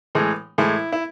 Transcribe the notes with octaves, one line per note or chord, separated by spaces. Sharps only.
A2 E3 G#3
A2 E3 G#3 E4
E4